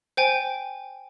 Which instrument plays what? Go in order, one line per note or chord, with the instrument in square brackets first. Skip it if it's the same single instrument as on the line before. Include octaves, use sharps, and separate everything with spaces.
[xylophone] C5 G5 G#5